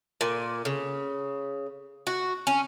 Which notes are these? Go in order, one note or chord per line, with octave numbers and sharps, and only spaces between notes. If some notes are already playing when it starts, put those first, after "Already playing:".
A#2
C#3
F#4
C#4